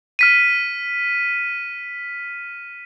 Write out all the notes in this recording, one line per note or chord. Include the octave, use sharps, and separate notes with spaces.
F6 B6 D#7